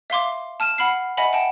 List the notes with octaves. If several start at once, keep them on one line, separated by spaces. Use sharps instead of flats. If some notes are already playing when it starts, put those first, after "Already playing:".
E5 F5 C6 D6
A5 F6 D#7 E7
F#5 B5 F6 C7
D#5 E5 F#5 G#5 B5
F#5 G5 A5